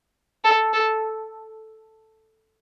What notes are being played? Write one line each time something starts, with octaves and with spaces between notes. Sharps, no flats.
A4
A4